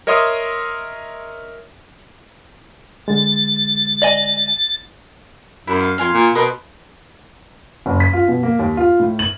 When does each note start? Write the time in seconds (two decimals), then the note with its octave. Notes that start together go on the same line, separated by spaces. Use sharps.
0.07 A#4 C#5 D#5 E5 C6 D#6
3.08 D3 G#3 A6
4.02 D5 D#5 G#5
5.67 F#2 E4
5.80 F5
5.98 F2 F5 G#5 C6
6.13 A#2
6.35 B2 A#4 D#5 C6
7.86 F#1
8.00 B6
8.13 F4
8.28 B2
8.43 A#3
8.59 D#2
8.77 F4
9.00 A2
9.19 F#7